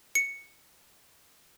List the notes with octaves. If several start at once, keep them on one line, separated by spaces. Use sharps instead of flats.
C#7